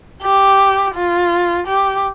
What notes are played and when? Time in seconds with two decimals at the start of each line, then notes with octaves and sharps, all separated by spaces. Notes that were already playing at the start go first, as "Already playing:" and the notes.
0.23 G4
0.95 F4
1.67 G4